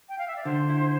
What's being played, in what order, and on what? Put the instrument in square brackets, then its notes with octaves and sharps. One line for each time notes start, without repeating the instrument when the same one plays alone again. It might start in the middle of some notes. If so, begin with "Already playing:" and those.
[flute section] G5
F5
E5
D5
[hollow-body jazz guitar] D3 [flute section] C5
[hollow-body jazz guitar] E4